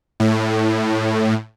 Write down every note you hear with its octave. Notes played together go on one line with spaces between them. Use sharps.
A2